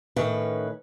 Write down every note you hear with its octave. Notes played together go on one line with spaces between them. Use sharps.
A2 D#3 C#4 B4